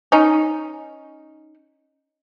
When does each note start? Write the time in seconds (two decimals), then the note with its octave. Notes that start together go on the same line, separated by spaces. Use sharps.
0.12 C#4 D#4